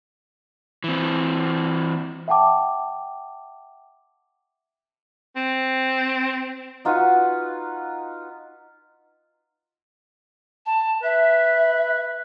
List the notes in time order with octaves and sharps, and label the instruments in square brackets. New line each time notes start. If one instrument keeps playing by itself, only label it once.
[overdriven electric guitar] E3 C4
[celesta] E5 F#5 G5 A5 D6
[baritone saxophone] C4
[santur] D#4 F4 F#4 B4
[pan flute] A5
[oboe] B4 [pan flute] E5